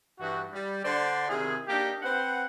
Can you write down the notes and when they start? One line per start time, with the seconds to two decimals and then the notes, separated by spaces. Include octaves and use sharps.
0.19 G2 E3 F#4
0.53 G3
0.85 D3 D4 C5 D5 F#5 C6
1.29 C3 D#3 E4 G#4
1.67 A#3 D4 D#4 G4
2.03 C4 B4 C5 F#5